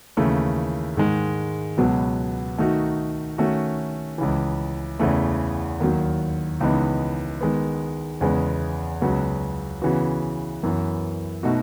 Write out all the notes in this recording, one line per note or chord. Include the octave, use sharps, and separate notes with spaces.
D#2 C#3 E3 A3
G#2 D#3 G#3
C#2 B2 F#3 B3
D#3 A3 D#4 F#4
D#3 A3 C#4 F#4
C#2 C#3 E3
E2 C#3 E3 A3
D#2 D#3 F#3
C#2 C#3 E3 B3 D#4
D#3 G#3 B3
E2 C#3 G#3 B3
C#2 C#3 F#3 B3 F#4
C#3 E3 B3 F#4
F#2 E3 B3
B2 A3 D#4 F#4